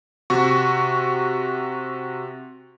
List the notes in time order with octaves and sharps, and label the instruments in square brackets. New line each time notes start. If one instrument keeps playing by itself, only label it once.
[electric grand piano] C3 F#4 C#6